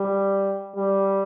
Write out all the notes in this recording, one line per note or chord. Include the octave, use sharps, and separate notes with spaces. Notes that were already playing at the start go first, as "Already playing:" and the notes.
Already playing: G3
G3